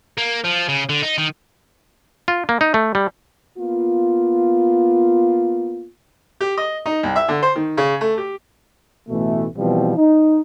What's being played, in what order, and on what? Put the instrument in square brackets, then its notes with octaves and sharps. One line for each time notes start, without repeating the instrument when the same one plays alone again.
[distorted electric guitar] A#3
F3
C#3
D3
D#4
D#3
[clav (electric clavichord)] F4
A#3
D#4
A3
G3
[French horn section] A#3 B3 F4
[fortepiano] G4
D#5
D#4
C2
E5
D3
C5
D#3
C#3
A3
G4
[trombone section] A1 B2 E3 A3
B2 E3 F3 G3 C4
D#4